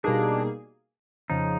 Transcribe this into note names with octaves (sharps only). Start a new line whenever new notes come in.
B2 G3 A#3 D4 D#4 G#4
F2 C#3 F3 D#4